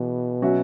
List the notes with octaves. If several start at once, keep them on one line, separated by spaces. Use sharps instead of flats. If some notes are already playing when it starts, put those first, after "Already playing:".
Already playing: B2 E3 B3 G#4
F#3 C#4 F#4 E5